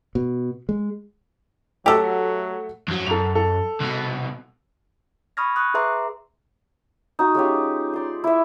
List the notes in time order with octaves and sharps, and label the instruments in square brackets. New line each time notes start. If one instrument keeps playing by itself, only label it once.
[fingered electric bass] B2
G#3
[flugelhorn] F#3 [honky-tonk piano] A3 F#4 [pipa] G4 A4
[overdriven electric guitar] F2 F#3
[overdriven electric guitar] F#2 [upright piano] A4 A#5 F7
[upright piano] A4
[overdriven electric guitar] C2 B2
[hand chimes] B5 C#6 D#6 F6 G#6 A#6
C#6 D#6 F#6
G#4 B4 E5 A#5 C6 D6
[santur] D#4 F#4
G#3 C#4 F4 G4
D5 C6
E4 E5